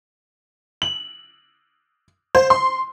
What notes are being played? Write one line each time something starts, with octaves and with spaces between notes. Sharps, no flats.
F#7
C5
C6